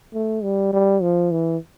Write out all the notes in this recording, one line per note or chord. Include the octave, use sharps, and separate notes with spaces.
A3
G3
G3
F3
E3